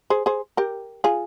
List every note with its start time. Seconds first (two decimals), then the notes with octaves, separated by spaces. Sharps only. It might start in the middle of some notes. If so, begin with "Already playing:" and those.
0.10 G#4 C5
0.26 G#4 C5
0.57 G4 A#4
1.04 F4 G#4